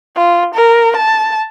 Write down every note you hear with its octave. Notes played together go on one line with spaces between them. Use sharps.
F4
A#4
A5